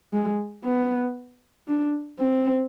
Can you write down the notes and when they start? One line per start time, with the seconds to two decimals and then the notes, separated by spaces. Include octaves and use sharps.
0.13 G#3
0.65 B3
1.68 D4
2.19 C4